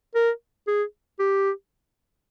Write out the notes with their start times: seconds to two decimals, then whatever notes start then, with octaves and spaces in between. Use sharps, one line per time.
0.15 A#4
0.67 G#4
1.19 G4